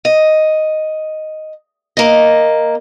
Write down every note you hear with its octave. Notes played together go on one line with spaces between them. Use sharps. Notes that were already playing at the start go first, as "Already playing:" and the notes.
D#5
A#3 D#5